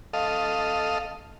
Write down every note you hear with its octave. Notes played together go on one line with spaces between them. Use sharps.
A4 D#5 F5